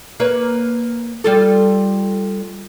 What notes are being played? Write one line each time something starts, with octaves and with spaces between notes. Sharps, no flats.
A#3 B4 C#5
G3 F4 A4